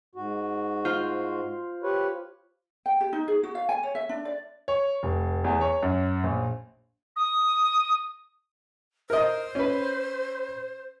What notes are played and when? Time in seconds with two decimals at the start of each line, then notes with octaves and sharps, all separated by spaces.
0.15 G#2 F#4
0.85 F4 C5
1.83 G4 B4 C#5
2.86 G5
3.01 G4
3.13 D#4
3.28 G#4
3.43 F#4
3.55 F5
3.69 G#5
3.83 C#5
3.95 E5
4.09 D4
4.25 D5
4.68 C#5
5.03 F1
5.44 E2
5.61 C#5
5.83 F#2
6.23 A#1
7.16 D#6
9.10 A#4 C5 D#5
9.55 C#4 B4